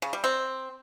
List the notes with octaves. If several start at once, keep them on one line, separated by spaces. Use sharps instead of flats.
C#3
G3
C4